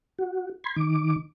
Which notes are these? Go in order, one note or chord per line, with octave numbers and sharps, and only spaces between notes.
F#4
B5 C6 G#6
D#3 D6